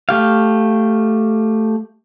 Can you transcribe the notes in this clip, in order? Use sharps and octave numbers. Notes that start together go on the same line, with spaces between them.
A3 G4 F5